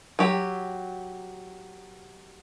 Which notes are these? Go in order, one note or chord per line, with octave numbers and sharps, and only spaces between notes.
F#3 G4